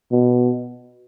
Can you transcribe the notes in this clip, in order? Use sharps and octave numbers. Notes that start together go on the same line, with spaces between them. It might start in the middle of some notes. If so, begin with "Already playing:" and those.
B2